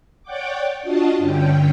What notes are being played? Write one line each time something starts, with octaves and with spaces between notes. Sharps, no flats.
C#5 D5 F#5 G5 D6
D4 F4 F#4 D#5 A5
G2 D3 C#4 G5